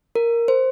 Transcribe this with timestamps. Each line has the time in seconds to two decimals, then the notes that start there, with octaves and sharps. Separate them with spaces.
0.15 A#4
0.48 C5